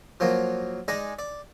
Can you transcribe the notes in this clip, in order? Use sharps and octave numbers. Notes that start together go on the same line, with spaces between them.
F3 F#3 A#3
G#3 D#4 D5 D#5
D5